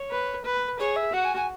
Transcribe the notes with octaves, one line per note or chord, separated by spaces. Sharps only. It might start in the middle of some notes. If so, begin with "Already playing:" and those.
Already playing: C#5
B4
B4
G#4 C#5
E5
F#4 F#5
G#5
G#5